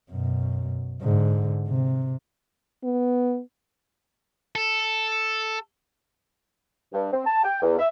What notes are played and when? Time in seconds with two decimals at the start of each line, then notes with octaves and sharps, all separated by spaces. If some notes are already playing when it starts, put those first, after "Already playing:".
0.11 F#2 B2
1.02 G#2 D3
1.68 C3
2.84 B3
4.56 A4
6.92 G2
7.12 C4
7.25 A5
7.43 G5
7.62 E2
7.78 E5